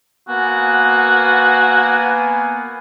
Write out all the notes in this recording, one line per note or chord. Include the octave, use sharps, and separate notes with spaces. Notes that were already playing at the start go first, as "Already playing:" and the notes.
A#3 B3 F#4 G#5